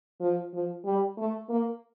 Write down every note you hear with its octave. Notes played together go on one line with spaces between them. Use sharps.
F3
F3
G3
A3
A#3